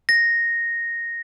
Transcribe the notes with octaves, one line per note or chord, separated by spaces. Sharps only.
A#6